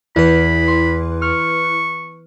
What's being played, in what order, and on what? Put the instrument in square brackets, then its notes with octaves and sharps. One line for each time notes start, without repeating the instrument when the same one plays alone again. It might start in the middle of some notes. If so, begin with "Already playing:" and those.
[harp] E2 [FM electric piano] E4 B4 [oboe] B5
[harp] C6
[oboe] C#6 [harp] F6